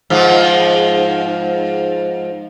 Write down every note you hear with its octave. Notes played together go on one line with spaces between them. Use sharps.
G#2 F3